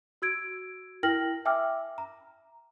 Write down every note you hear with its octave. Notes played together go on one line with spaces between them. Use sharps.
F#4 E6 G#6 D7
E4 A#4 G5 F6 A#6 F#7
E5 G5 G#5 D6 E6 F6
A#5